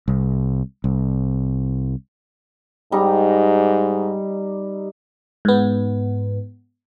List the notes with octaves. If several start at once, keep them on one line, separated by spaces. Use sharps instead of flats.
C2
C2
G#2 G3 D#4
G#2 B3